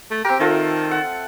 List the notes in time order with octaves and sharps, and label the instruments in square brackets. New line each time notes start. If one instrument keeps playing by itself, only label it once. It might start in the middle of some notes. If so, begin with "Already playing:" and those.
[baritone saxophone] A3
[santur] C4 A#4 [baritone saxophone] G4
[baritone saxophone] D#3 [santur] F4 A4 E5
[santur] F#5